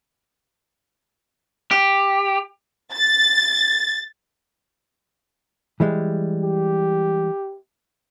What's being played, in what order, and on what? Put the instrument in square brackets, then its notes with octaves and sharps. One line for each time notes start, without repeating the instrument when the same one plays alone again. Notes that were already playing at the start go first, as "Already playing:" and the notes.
[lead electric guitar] G4
[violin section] A6
[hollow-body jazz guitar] E3 G3 G#3
[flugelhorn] G4